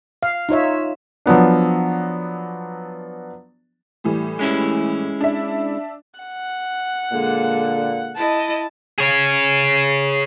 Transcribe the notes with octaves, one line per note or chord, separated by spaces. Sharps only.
F5
D#4 F4 C#5 E5
F3 F#3 B3 D4
A2 E3 G3
G#3 C#4 E4
D4 E5
F#5
A#2 D3 G#3 A#3 A4
E4 D#5 A5
G#4 C#5